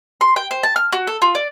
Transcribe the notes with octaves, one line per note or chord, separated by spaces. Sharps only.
C6
G5
C5
A5
F6
F#4
A4
F4
D5